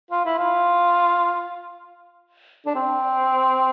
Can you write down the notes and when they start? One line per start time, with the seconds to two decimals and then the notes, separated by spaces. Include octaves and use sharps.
0.11 F4
0.25 E4
0.39 F4
2.66 D4
2.76 C4